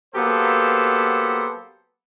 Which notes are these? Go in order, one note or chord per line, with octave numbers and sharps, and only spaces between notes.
F#3 A#3 B3 G4 A4 C5